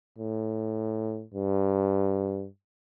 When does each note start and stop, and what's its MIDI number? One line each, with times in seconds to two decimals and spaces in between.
0.18 1.24 45
1.34 2.47 43